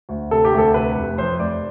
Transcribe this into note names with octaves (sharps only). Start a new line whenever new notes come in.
D2
C3 A4
G4
D2
A4
C3 B4
F1
F2 C5
F1 D5